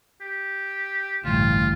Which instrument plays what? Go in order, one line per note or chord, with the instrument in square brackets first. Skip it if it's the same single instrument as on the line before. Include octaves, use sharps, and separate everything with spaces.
[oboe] G4
[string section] A1 [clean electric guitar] D2 G2 [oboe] F4